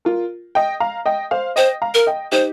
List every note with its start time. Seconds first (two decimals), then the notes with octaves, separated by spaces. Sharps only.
0.05 F4 A#4
0.55 D#5 G5
0.80 F5 A#5
1.06 D#5 G5
1.31 C5 F5
1.56 C5 D#5 G5
1.82 F5 A#5
1.94 A#4
2.07 D#5 G5
2.32 D#4 G4 C5